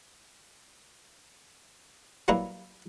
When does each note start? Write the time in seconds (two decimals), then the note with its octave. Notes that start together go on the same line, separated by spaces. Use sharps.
2.28 F#3 G3 A#3 E4 B4